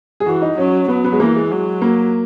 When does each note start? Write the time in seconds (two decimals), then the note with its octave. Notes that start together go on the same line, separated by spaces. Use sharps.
0.20 G#4
0.26 E3 F#4
0.42 D#4
0.58 F#3 C#4
0.88 F#3 B3
1.04 B3
1.13 G#3
1.20 E3 A#3
1.36 G#3
1.51 F#3
1.82 A#3